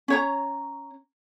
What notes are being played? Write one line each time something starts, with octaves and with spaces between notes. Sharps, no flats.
C#4 C#5 A#5